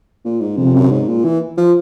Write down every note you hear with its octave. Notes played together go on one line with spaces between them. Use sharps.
A#2
G#2
F2 C3
F#2
G#2
A#2
E3
F3